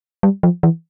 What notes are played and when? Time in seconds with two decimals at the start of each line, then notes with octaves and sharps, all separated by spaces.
0.23 G3
0.43 F3
0.63 E3